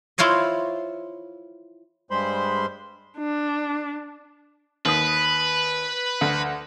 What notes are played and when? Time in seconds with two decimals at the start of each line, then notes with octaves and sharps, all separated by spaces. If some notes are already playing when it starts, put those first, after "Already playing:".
0.18 E4 F4 C5 C#5 D#5
2.11 G2 G3 G#3 C5 B5 C6
3.18 D4
4.86 D#2 B4 D#6
6.21 D2